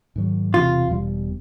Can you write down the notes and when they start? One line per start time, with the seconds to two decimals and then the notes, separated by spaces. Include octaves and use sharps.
0.16 G#2 D#3 F#3
0.53 E1 D2 C3 E3 F4
0.91 E1 E2 B2 G3